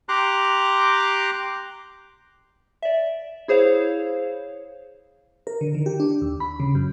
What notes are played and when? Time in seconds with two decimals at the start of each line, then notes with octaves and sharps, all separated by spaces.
0.09 G4 A#5 C6 D6 F#6
2.82 D5 E5
3.48 E4 G#4 C5 C#5 F5
5.47 A#4
5.61 D3
5.74 D#3
5.86 G4
6.00 D4
6.22 D#2
6.40 B5
6.60 C#3
6.75 F#2